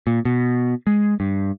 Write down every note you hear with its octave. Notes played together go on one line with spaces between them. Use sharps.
A#2
B2
G#3
G2